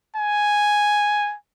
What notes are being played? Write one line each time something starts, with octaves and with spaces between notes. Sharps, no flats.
G#5